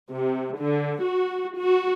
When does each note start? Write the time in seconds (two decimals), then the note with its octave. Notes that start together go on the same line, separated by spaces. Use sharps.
0.11 C3
0.56 D3
1.03 F#4
1.58 F#4